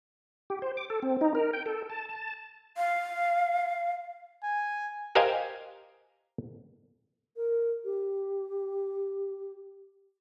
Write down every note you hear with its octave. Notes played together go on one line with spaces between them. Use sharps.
G4
C5
D6
A4
C4
D#4
A#4
G5
A4
A5
A5
F5
G#5
G4 A#4 C5 D#5 F5 G#5
A#4
G4